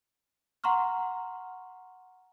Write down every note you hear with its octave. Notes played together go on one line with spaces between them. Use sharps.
F#5 A#5 C6 C#6 F6